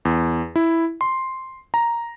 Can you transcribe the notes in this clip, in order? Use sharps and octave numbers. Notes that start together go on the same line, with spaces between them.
E2
E4
C6
A#5